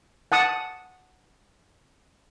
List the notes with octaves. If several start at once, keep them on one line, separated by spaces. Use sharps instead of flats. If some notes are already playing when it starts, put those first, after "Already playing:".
F#5 A5 D#6